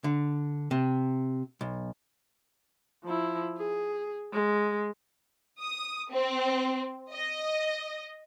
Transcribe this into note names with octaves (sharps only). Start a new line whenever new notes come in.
D3
C3
B1
F3 E4
G#4
G#3
D#6
C4
D#5